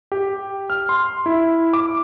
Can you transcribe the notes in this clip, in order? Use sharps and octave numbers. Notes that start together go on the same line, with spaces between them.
G4
F6
C6
E4
D6